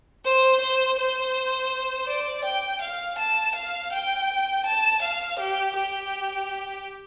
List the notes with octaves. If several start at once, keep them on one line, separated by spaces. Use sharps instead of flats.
C5
C5
C5
D5
G5
F5
A5
F5
G5
A5
F5
G4
G4